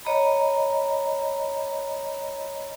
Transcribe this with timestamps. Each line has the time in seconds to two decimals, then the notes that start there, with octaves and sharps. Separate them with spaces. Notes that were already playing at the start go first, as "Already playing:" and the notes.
0.05 C#5 D#5 A#5 B5